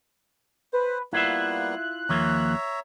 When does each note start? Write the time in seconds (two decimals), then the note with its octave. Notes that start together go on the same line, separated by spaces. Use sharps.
0.73 B4 C5
1.13 G3 A#3 B3 E4 F4 E5 F#6
2.09 D#2 F3 A#3 C#5 E5 A#5